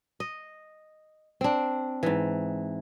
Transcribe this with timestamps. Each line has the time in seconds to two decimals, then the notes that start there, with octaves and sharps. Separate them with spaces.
0.20 D#5
1.41 C4 D4
2.03 G#2 E3